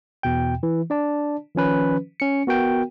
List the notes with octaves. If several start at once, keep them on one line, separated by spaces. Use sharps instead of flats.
E2 B2 G5
E3
D4 D5 A5
D#3 F3 C#4 B4
C#4 C#7
B3 F#4 A#4 G5